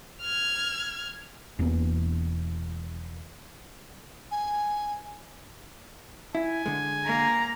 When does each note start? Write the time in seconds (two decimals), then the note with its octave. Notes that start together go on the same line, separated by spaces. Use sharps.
0.22 F6 G#6
1.59 E1 E2 A#3 B3
4.31 G#5
6.35 E4 G#5
6.66 D3 G#3
7.06 A#3 A#5